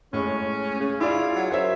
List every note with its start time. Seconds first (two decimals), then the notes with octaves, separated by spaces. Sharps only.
0.13 A2 G#3 C#4
0.80 C#3
1.00 E4 F4 G#4 D5
1.36 F#3
1.51 F#2 C5 C#5 E5